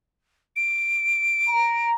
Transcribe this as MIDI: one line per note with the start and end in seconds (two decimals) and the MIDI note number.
0.56 1.90 98
1.49 1.95 82